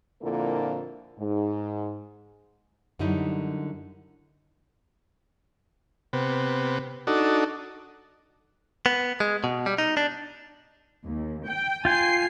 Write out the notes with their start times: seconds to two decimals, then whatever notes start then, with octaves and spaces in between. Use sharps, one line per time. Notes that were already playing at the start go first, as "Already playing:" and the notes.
0.22 F2 A#2 D3 A#3 E4 A#4
1.18 G#2
2.99 F#2 D3 G3 D#4 E4
6.13 C3 B3
7.07 D4 D#4 F#4 A4
8.86 B3
9.20 G#3
9.44 B2
9.66 G3
9.78 D#4
9.97 D4
11.07 D#2
11.48 G5
11.85 F4 G5 G#5 C7